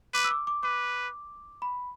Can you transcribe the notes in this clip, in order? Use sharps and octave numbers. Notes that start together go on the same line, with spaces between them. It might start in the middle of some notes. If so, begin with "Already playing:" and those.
B4 D6
E6
D6
D6
B4 D6
B5